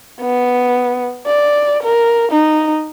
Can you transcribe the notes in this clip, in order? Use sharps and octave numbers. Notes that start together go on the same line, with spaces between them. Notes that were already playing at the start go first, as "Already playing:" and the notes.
B3
D5
A#4
D#4